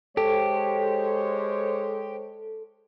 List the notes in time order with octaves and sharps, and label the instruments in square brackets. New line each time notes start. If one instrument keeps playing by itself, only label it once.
[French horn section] G#3 C5 C#5 [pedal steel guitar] G4 [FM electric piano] A4